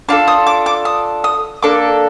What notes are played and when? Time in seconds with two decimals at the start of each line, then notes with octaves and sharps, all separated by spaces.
0.08 D4 F4 A4 D6
0.28 D#6
0.47 D6
0.66 D6
0.85 D#6
1.24 D#6
1.63 A#3 D4 A4 D6